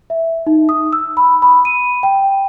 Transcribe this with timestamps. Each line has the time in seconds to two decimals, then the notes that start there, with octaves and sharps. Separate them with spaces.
0.10 E5
0.47 D#4
0.69 D#6
0.93 E6
1.17 B5
1.42 B5
1.65 D#7
2.03 G5